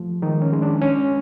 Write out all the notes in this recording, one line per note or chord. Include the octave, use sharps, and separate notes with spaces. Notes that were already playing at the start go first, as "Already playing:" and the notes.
Already playing: F3 A3
D#3 G#3 D#4
C#4
G#3
D4
C#4